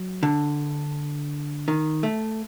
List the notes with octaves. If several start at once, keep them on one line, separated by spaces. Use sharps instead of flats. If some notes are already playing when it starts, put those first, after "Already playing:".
Already playing: F#3
D3
D#3
A3